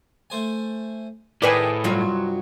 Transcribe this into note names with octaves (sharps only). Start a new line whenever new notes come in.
A3 C5 G#5
A2 D#3 G#4 B4 D5
C2 G2 F#3 F4